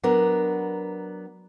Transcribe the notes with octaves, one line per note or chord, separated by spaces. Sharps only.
F#3 B3 D4 A#4